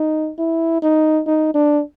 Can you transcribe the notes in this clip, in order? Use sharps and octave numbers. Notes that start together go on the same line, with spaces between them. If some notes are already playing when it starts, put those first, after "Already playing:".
Already playing: D#4
E4
D#4
D#4
D4